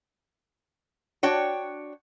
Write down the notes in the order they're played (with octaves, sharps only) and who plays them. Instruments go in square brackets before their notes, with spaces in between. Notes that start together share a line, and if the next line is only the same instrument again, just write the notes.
[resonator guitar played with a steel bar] D4 F#4 C#5 G5